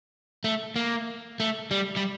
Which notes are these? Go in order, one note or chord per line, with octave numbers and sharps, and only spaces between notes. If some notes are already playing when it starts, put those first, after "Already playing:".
A3
A#3
A3
G3
G3